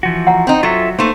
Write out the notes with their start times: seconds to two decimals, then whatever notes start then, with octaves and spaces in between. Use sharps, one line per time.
0.03 E3 F3 F#4
0.27 F#5 A#5
0.47 C4 D#4
0.63 F#3 F4 A4 E5
0.99 A3 A#3 D#4 B4 C5